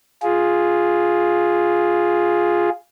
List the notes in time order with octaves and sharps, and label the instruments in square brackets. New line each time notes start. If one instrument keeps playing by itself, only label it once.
[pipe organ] F4 G#4